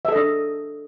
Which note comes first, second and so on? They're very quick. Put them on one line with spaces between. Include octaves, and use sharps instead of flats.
E5 A4 D#5 D4